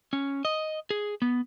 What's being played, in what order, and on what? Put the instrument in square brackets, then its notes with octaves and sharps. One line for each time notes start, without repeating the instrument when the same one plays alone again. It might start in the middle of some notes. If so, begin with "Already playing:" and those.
[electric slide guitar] C#4
D#5
G#4
B3